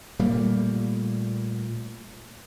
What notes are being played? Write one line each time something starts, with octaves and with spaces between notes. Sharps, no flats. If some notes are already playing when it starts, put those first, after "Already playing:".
A#2 G3 A3 A#3